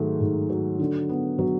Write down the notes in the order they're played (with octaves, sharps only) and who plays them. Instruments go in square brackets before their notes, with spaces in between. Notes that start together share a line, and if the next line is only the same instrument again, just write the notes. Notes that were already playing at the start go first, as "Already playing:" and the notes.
Already playing: [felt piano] G#2 D#3 F#3 A3
G#2
F#3
D3
B3
F#3